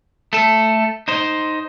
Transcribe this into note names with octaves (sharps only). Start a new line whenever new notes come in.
A3 A4
D#4 C5